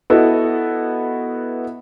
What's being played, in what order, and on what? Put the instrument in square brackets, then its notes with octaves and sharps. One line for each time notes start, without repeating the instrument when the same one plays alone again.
[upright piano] B3 E4 F#4 A4 D#5